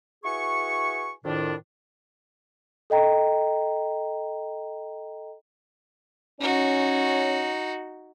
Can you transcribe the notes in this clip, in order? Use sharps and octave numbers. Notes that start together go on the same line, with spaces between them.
E4 F#4 G#4 B4 G#5 C#6
F2 A2 D#3 D4
A4 D#5 G5 A#5
C#4 D#4 F#4